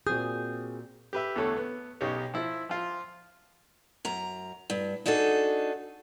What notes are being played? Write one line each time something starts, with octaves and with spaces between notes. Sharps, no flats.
A#2 C4 F#4 G#4 D#6 G6
G4 B4 E5
E2 D3 A3 A4 C#5
B3
B1 C#3 D#4 G4 C#5
F3 E4
F3 F4
F#2 A#5
G2
D4 D#4 F#4 G#4 A4